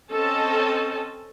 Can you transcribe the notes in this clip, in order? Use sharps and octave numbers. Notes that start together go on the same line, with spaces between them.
C4 C#4 A4 D#5 A5